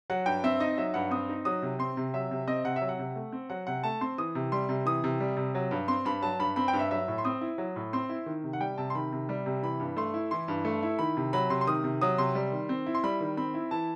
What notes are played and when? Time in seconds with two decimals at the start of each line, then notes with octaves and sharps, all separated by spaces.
0.10 F#3 F#5
0.26 G2 G5
0.44 C4 E5
0.60 D#4 D#5
0.78 F#3 E5
0.94 G2 F#5
1.11 C4 D#6
1.29 D#4
1.45 F#3 D#6
1.62 C3
1.79 C4 C6
1.97 C3
2.14 F#3 E5
2.31 C3
2.48 C4 D#5
2.65 C3 F#5
2.76 E5
2.82 F#3
2.89 F#5
2.99 C3
3.15 A3
3.32 C4
3.50 F#3 F#5
3.67 C3 F#5
3.83 A3 A5
4.01 C4 C6
4.18 E3 D#6
4.35 C3
4.52 G3 C6
4.69 C3
4.86 E3 D#6
5.04 C3
5.20 G3
5.37 C3
5.55 F#3
5.71 G2
5.88 C4 C6
6.05 G2 B5
6.22 F#3 A5
6.39 G2 B5
6.56 C4 B5
6.68 G5
6.73 G2
6.79 E5
6.91 F#3 E5
7.08 A2
7.18 C6
7.25 C4 D#6
7.41 E4
7.58 F#3
7.76 A2
7.93 C4 C6
8.09 E4
8.26 D#3
8.44 C3
8.53 F#5
8.60 G3 G5
8.78 C3 A5
8.90 C6
8.95 D#3 B5
9.12 C3
9.29 G3
9.46 C3
9.63 E3 B5
9.80 G2
9.96 A3 C6
10.14 E4
10.31 E3 C6
10.48 G2
10.65 A3
10.83 E4
10.99 D#3 B5
11.17 C3
11.33 F#3 B5
11.50 C3 C6
11.61 C6
11.67 D#3 D#6
11.84 C3
12.01 F#3 D#6
12.18 C3 C6
12.35 G3
12.52 D#3
12.69 C4
12.86 E4
12.95 C6
13.04 G3 B5
13.20 D#3
13.37 C4 B5
13.54 E4
13.71 E3 A5